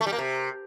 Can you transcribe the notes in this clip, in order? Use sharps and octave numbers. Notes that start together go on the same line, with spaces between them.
A3
G3
A#3
C3